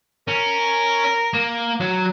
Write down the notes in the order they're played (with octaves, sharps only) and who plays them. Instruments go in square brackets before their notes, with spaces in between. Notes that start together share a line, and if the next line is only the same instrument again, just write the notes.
[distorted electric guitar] C#4 [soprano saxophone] A#4
[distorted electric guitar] A#3
F#3